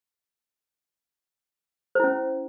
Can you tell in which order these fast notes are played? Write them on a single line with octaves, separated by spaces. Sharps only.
C5 E4 C#4